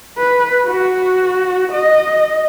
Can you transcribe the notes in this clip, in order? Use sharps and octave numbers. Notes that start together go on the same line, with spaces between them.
B4
F#4
D#5